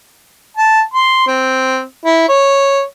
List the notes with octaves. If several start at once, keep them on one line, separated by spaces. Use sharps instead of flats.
A5
C6
C4
E4
C#5